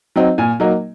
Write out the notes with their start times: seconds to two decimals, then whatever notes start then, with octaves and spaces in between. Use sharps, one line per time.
0.16 F#3 C4 D#4
0.38 A#2 G#5
0.60 F#3 A#3 D#4